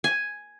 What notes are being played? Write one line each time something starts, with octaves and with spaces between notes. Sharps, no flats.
G#5